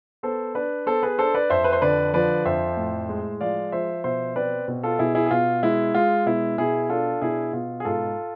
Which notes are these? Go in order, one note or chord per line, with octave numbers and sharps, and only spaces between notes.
B3 A4 C5
D4 B4 D5
B3 A4 C5
G#4 B4
D4 A4 C5
B4 D5
F2 C5 E5
B4
C5
D3 B4 D5
F3 B4 D5
F2 C5 E5
A2
G#3
F3 D5 F5
F3 C5 E5
B2 C5 E5
C4 B4 D5
B2
F4 A4
B2 E4 G#4
E4 G#4
G#4
B2 F4
G#3 E4
G#3 F4
B2 E4
B2 E4 G#4
D4 F4 A4
B2 E4 G#4
B2 F4
G#4
G#2 F4 A4